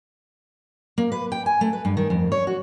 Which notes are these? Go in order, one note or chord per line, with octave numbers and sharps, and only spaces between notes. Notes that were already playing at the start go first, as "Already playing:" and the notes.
A#3
B4
G5
G#5
A3
B4
G2
D#3
F2
C#5
F#4